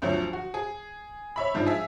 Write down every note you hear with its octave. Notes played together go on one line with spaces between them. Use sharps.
D2 F3 F#3
F#4
G#4
C#5 E5 B5
G#2 F3 G#3 D4
G#4 E5 F5